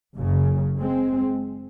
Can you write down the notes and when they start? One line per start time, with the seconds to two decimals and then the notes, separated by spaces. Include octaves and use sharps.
0.14 F#1 F#2 C#3
0.79 G#3 C4